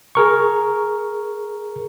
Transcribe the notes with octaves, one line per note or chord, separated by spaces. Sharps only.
G#4 A#4 C#6